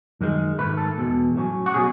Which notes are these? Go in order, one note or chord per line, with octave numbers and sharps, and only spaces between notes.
F#2 D#3 G#3
G#2 D#3 A3 B4
A4
E2 B2 G#3
A2 F#3 C#4
F#4
B2 F#3 C#4 G#4